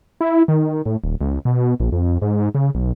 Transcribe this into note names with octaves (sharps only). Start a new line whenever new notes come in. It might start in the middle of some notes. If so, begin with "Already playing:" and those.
E4
D#3
A2
D#1
C#2
B2
A#1
F2
G#2
C#3
B1